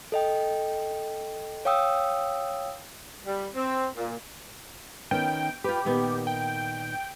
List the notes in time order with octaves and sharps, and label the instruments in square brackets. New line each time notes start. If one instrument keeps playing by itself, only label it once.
[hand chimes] A4 D#5 G5
C#5 F5 G5 D#6 E6
[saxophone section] G3
C4
A#2
[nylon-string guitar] D#3 B3 C#4 [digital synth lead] G5
[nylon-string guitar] F4 B4 [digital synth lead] G4
[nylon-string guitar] A#2 D#3 B3
[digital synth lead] G5